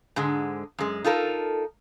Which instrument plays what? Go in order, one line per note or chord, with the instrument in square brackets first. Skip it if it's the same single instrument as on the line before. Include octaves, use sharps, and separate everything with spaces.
[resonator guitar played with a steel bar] G#2 D3 G#3
F#2 G#3
D#4 F4 A4 A#4